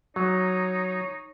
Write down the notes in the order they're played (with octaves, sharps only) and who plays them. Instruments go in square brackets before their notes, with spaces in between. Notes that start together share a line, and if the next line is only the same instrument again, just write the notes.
[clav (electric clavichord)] F#3 [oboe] D#4 [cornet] C#5